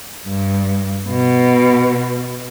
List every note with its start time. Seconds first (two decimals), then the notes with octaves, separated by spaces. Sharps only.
0.25 G2
1.09 B2